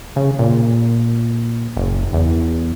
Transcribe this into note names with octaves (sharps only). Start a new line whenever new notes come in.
C#3
A#2
F#1
E2